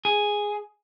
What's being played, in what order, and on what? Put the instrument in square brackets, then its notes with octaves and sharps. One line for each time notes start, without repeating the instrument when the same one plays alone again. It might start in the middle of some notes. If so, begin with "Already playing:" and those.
[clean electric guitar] G#4